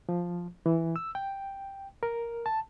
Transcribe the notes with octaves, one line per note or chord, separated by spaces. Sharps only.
F3
E3
E6
G5
A#4
A5